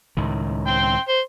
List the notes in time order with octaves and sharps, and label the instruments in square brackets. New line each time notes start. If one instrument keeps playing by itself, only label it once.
[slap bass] C#2 A2 D#3
[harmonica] G5 C6
C5